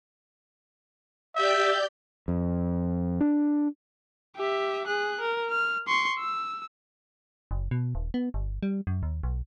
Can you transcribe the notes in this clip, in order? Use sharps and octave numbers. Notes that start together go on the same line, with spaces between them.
G4 D5 E5 G6
F2
D4
G4 E5
G#4 F#6
A#4
F6
C6 C#6
E6
F#1
B2
D#1
B3
G1
G3
F#2
D#2
B1